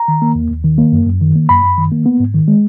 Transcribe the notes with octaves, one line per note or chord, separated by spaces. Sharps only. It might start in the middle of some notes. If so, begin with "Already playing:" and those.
Already playing: A#5
D#3
A#3
D#2
D#2
D#3
A#3
F#2
F#2
D#3
A#3
F#2 B5
F#2
D#3
A#3
B3
G#2
D#3
G#3